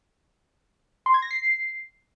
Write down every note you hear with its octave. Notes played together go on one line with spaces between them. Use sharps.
C6
G#6
A#6
C7